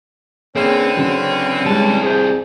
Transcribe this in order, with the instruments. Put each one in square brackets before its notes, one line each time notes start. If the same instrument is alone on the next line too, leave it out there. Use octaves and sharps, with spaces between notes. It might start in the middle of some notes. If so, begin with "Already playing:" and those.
[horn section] D3 E3 C#4 [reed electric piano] A#3 G#4 [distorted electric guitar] C4
[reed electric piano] C#3 F#3
[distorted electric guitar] C2 A5 [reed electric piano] G3 G#3
[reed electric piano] G#4 C5 G6